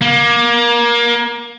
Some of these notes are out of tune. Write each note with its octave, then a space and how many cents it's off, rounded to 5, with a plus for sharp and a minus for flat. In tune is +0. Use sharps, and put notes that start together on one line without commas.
A#3 +25